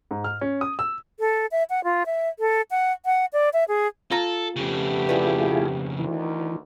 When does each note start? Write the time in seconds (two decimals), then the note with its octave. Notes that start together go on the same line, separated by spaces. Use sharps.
0.11 G#2
0.24 F6
0.41 C#4
0.61 D#6
0.79 E6
1.20 A4
1.52 E5
1.70 F#5
1.84 F4
2.06 E5
2.39 A4
2.71 F#5
3.05 F#5
3.33 D5
3.53 E5
3.68 G#4
4.11 F4 A4 A#5
4.56 F2 C#3 A3 B3 G4
5.09 E4 F4 G#4 B4 D5
5.99 D2 D#3 E3